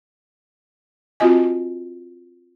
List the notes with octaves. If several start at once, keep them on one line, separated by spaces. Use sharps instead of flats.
C4 F4 F#4 D#5 G#5